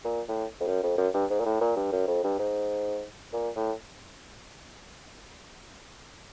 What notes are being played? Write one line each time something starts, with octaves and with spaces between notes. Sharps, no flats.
A#2
A2
F2
F#2
F2
F#2
G2
G#2
A#2
A2
A#2
G2
F#2
F2
G2
G#2
A#2
A2